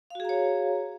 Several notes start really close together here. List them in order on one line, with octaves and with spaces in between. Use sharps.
F5 F#4 G#4 A#5 C#5